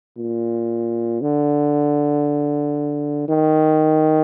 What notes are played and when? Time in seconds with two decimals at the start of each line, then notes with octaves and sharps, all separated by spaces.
0.18 A#2
1.21 D3
3.29 D#3